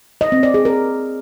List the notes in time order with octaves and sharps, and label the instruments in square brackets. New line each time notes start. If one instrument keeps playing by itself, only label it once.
[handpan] D#5
C4
D5
G#4
A#4